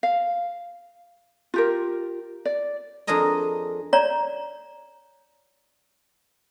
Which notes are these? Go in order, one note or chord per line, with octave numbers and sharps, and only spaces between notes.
F5
F4 G4 A#4
D5
F2 D4 G#4 A#4 D#5
C#5 D5 A#5